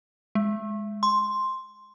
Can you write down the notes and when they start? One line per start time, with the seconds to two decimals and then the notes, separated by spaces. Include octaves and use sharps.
0.35 G#3
1.03 C6